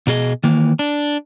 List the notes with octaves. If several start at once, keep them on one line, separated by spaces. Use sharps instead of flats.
B2 D4 G#4 D#5
D#3 E3 A#3
D4